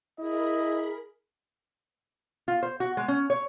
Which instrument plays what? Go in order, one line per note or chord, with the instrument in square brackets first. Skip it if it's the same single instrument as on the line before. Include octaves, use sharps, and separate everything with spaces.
[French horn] E4 [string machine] G#4 A#4 B5 [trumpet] D#5
[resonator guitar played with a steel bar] F4
C5
F#4
G#3
C#4
C#5